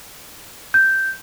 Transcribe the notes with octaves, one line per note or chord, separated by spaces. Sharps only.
G6